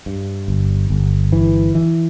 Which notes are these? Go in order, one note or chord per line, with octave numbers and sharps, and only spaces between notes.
G2
G1
G1
E3
E3